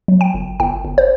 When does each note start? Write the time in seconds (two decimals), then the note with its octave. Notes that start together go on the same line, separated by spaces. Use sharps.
0.08 F#3
0.21 G5
0.34 G1
0.60 G1 G5
0.85 G1
0.98 C5